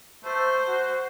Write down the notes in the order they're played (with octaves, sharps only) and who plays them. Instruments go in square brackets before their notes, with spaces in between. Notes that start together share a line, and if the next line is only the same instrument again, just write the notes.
[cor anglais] A3 [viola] C5
[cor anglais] F#4